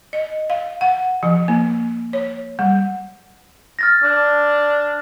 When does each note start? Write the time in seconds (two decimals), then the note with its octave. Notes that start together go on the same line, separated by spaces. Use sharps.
0.13 D#5
0.50 F5
0.81 F#5
1.23 F3
1.48 A#3
2.13 C#5
2.59 G3
3.79 F6 A6 A#6
4.03 D4